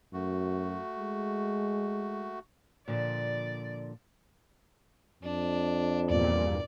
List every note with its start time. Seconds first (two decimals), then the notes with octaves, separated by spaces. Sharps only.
0.13 F#2 A3 F#4
0.99 G#3
2.88 A#2 D3 F3 D5
5.23 F2 D4
6.10 E2 G2 A#2 D5